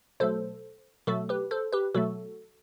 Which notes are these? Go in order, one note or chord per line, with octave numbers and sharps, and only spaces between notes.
B2 F#3 A3 A4 C5
B2 F#3 A3 F#4 A4
G4 B4
A4 C5
G4 B4
B2 F#3 A3 F#4 A4